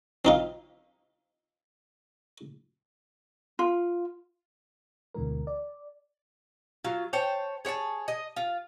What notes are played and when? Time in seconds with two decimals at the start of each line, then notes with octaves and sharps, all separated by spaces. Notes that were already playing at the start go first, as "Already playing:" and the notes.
0.25 C4 D#4 F4
3.59 F4
5.14 D2 B2 D3 E3 G#3 A#4
5.47 D5
6.84 F#3 F4
7.13 C5 C#5 G5 A5
7.65 G#4 C#5 G5 A5
8.08 D#5
8.37 F4